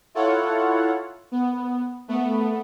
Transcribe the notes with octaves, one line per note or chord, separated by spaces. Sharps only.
E4 F4 A4 C#5 F#5
B3
A3 B3